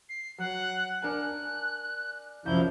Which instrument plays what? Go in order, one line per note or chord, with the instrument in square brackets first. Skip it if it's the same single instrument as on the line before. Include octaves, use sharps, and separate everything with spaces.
[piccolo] C7
[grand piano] F#3 [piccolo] F#5
[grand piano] D4 A#4 G#5 [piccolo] F#6
[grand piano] C2 [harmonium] F#2 F3 E4 [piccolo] G6